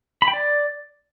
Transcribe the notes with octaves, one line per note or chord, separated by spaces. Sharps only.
B5
G5
D5